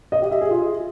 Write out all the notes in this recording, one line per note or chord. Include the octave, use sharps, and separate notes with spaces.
D#5
G4
E5
G#4
F4